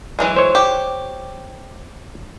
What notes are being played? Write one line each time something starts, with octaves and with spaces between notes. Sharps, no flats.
E3 F#3 G#3
C5 C#5
G4